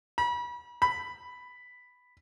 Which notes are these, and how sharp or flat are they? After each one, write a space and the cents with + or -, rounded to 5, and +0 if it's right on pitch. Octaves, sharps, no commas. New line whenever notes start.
B5 -35
B5 +5